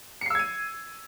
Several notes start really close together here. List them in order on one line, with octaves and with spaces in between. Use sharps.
C#7 C7 E6 G#6 D#7